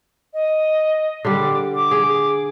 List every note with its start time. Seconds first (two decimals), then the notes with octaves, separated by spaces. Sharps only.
0.33 D#5
1.25 D3 G3 D6
1.75 D6
1.91 G#4